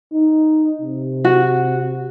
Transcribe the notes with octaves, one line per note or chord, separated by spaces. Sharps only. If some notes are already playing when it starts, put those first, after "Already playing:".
D#4
C3
F#4